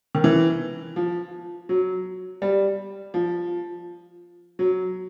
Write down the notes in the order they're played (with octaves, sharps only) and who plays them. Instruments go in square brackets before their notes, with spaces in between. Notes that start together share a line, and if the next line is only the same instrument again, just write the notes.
[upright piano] D#3
E3
F3
F#3
G3
F3
F#3